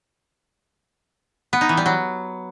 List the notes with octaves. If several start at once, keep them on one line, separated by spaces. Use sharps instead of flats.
B3
D#4
E3
G3
F#3